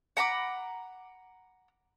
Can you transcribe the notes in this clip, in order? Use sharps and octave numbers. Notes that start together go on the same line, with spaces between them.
F#5 A#5 B5 D6